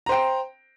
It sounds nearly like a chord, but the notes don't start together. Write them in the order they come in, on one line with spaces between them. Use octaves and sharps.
A#5 C5 G5